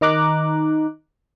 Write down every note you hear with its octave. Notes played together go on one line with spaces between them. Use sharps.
D#3 D#4 A#5 D6 F#6